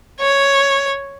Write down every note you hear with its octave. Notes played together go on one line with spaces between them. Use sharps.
C#5